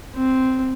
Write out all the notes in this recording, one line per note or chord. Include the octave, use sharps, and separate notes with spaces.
C4